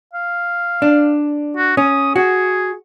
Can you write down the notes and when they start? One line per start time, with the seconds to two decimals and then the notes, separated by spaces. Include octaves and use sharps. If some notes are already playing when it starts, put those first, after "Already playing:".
0.13 F5
0.82 D4
1.57 F#4
1.77 C#4 D#6
2.16 F#4 G#4